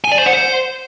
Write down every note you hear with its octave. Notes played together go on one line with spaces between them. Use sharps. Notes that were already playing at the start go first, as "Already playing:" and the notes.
G#5
D5
C5
F#5
C5